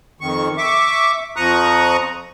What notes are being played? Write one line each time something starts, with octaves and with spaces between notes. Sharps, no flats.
F2 D#3 C#6
E5 C#6 D6
F2 F3 A#5 C#6 D#6 F#6